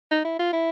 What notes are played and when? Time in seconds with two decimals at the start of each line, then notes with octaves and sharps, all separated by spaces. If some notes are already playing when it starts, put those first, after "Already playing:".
0.11 D#4
0.25 E4
0.39 F4
0.53 E4